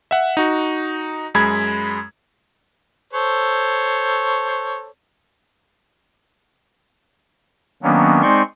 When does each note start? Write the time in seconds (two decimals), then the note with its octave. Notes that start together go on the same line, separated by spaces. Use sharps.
0.11 E5 F#5
0.37 D#4 F#4
1.34 F#2 G#3 B5 G#6
3.13 A4 C5 C#5
7.83 D#3 F#3 A#3 B3 C#4 D4
8.22 G#3 C4 D#4 D5 C6 C#6